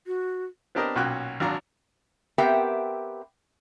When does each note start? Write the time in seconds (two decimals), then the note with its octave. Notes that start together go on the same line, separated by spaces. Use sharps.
0.07 F#4
0.75 B3 C4 D4 G4 A#4 D#5
0.96 B1 A#2 C#4 F#4 G5 F#6
1.40 G#1 F#3 D4 F5 A#5
2.38 B3 C4 G4 A#4 E5 G5